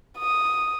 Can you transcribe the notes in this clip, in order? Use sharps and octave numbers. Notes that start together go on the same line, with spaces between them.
D#6